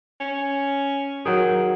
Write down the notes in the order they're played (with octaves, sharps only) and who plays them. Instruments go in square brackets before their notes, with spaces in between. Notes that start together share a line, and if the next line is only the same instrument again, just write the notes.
[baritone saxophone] C#4
[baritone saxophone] D#3 [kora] F#3 G#4